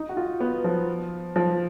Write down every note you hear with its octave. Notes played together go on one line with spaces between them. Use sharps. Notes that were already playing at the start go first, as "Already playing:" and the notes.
Already playing: D#4
F#4
F4
B3
F3
F3